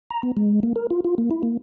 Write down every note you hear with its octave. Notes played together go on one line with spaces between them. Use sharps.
A#5
B3
G#3
A#3
A#4
F4
F4
A#3
E4
A#3